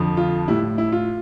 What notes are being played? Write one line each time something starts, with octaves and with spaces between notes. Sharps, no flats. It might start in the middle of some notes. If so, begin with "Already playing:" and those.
Already playing: F2 D3 F3
F4
A2 G3 E4
E4
F4